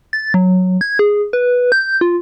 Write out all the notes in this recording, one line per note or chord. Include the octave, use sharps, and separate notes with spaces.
A6
F#3
G#6
G#4
B4
G6
F4